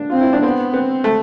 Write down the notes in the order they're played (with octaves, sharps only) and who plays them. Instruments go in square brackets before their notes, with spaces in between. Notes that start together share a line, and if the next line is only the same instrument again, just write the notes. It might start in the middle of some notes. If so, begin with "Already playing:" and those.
Already playing: [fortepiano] D4
[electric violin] C4 [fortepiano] F4
[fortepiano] E4
D4
[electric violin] B3 [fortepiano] C4
[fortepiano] B3 [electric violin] C4
[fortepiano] A3